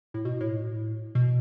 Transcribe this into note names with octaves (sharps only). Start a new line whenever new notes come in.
A2
B2
A2
B2